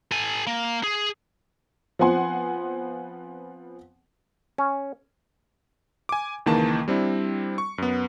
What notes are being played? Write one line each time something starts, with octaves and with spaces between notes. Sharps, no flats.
A4 G#5
A#3
G#4
F3 B3 C4 F#5 G#5 C6
C#4
G#5 D6
C#2 D#3 E3 A#3 A5
G3 C4 D4 E4
C#6
F#2 B3